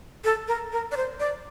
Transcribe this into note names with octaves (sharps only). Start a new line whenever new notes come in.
A4
A#4
A#4
D5
C5
D5